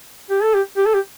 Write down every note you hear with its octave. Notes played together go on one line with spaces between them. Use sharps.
G4
A4
G4
G4
A4
G4